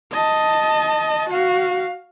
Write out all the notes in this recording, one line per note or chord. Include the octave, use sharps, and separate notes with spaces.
D#5 A5
F#4 F5